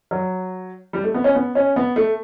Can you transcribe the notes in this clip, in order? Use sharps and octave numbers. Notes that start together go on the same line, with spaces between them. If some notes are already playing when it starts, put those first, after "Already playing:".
F#3
G3
A3
B3
C#4
B3
C#4
B3
A3